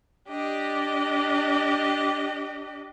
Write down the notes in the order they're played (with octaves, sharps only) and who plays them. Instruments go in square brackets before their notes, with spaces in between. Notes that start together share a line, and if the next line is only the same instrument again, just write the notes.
[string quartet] D4 G4 D#5